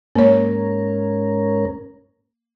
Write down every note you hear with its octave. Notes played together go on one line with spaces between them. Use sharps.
G#2 A#3 C#4 A#4 C#5